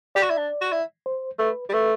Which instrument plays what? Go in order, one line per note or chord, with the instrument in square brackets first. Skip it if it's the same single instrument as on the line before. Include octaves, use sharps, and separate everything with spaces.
[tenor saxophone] G4 [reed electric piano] D5
[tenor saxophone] F#4
E4
D4
F#4
E4
[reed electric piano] C5
[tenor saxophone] A3 [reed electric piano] B4
[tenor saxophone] G3
[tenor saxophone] A3 [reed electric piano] B4